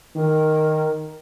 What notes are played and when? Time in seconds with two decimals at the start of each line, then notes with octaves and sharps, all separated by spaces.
0.16 D#3 A#4